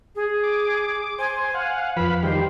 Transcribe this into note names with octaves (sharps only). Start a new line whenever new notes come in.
G#4
D6
C5 G#5
F5 F#5
F2 F3 B4 F5 B5
D#3 G3 G4 C5